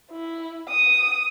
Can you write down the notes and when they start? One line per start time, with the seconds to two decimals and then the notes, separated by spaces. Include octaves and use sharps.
0.11 E4
0.68 D#6